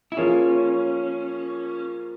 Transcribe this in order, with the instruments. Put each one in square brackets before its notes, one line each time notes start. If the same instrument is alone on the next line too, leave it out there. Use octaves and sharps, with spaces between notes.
[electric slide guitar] E4
[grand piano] F3 A#3 F4 G#4 [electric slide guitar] C#4